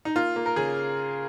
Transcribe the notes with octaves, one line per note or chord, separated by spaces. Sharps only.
D#4
A#3 F4
A#3
A#4
C#3 G#4